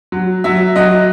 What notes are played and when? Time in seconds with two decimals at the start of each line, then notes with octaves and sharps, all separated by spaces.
0.12 F#3
0.44 F#3 E5
0.76 F#3 D#5